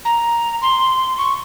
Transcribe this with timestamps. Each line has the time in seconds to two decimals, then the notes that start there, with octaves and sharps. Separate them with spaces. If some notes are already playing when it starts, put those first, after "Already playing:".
0.05 A#5
0.62 C6
1.18 C#6